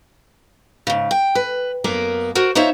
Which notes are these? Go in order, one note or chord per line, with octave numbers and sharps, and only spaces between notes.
G#2 C#3
G5
B4
F#2 A#3 B3 A#4
F#4 A#4 C5
D#4 F4 C5 C#5 E5